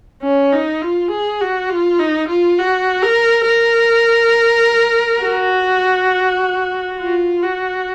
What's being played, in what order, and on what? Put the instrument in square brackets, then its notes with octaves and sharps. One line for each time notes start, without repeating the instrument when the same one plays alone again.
[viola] C#4
D#4
F4
G#4
F#4
F4
D#4
F4
F#4
A#4
A#4
F#4
F4
F#4